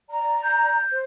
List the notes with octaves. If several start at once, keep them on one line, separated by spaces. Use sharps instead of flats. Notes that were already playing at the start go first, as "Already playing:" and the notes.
D5 A#5
G6
C5